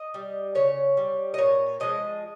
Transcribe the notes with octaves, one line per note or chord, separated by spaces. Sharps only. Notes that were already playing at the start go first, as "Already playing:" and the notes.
Already playing: D#5
G3
C#3 C#5
G3
D#5
A#2 C#5
F3 G#3 D#5